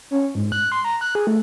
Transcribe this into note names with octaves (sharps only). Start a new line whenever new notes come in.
C#4
G#2
F#6
C6
A#5
F#6
G#4
A3